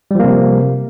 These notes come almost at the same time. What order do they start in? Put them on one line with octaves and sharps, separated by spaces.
G3 F3 A#3 C3